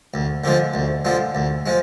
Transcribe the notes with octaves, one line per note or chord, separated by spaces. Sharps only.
D2
D3 F3 G#3
D2
D3 F3 G#3
D2
F3 G#3